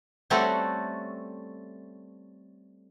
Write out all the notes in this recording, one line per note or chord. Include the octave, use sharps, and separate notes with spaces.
G3 A3 C4 C#4 F#4 A4